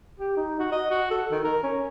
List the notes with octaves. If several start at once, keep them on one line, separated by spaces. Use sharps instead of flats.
G4
D#4
F#4
D#5
F#4
A4
D#3
A#4
C#4